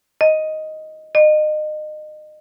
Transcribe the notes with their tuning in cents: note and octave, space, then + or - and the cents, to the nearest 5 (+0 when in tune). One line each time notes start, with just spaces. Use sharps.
D#5 +5
D#5 -30